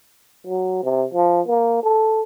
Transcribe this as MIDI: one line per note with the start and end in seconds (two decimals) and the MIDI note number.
0.47 0.80 54
0.83 1.06 48
1.14 1.41 53
1.48 1.80 58
1.83 2.22 69